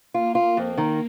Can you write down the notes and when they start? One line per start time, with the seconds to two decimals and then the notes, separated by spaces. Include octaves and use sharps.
0.14 A#3 F4
0.35 F4
0.57 F2
0.78 D#3